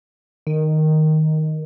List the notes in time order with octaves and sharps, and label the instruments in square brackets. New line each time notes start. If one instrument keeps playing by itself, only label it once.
[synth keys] D#3